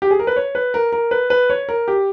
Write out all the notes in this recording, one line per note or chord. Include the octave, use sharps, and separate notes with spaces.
G4
G#4
A#4
B4
C#5
B4
A#4
A#4
B4
B4
C#5
A#4
G4